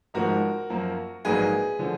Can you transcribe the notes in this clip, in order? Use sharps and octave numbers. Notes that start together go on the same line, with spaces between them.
G#1 G#2 F3 G#3 F#4 A#4
F#2 F3 A#3
A#1 G#2 F#3 A#3 G#4 B4
D3 F3